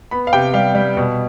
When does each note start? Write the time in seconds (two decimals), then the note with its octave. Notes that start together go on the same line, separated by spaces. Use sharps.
0.11 B3 B5
0.27 F5
0.33 C3 G5
0.54 G3 F5
0.75 G3
0.97 B2